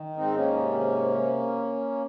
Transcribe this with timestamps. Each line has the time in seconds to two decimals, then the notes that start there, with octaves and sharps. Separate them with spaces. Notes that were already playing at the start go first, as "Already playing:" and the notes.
Already playing: D#3
0.16 G#2 C4 D#4
0.36 A#3 C#4
0.57 C3